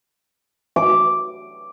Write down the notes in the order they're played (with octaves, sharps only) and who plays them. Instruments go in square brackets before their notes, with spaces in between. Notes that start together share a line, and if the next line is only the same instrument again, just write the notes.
[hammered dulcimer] D6